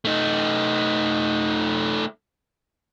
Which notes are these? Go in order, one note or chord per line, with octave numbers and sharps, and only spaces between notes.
A3 D#4